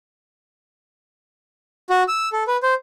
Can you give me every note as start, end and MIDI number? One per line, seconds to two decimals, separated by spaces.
1.90 2.03 66
2.08 2.29 88
2.32 2.43 69
2.47 2.57 71
2.63 2.74 72